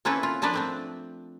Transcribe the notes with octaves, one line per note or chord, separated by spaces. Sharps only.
A#3 C4 C#4 E4 A4 B4
F4
F3 A#3 D4 B4 D5
A3 C4 D4